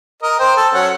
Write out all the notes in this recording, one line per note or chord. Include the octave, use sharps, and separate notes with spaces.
A#4 D#5
C5 G5
A4
F#3 C#4 F#5